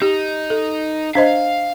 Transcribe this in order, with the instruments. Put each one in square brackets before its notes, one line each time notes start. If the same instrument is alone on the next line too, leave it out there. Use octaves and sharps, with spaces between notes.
[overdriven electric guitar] D#4 [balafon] G4
[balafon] A4
[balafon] D4 C5 D#5 [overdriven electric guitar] F5